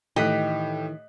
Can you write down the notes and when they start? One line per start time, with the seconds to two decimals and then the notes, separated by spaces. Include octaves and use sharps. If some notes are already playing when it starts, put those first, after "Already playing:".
0.16 A2 D#3 E3 G4 D#5 F#6 B6